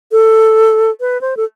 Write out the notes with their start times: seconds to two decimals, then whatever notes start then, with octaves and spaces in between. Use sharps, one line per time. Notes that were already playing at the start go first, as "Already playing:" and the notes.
0.12 A4
1.01 B4
1.21 C5
1.37 A4